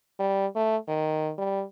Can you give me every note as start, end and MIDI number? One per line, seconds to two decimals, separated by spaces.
0.20 0.47 55
0.55 0.77 57
0.88 1.32 51
1.38 1.63 55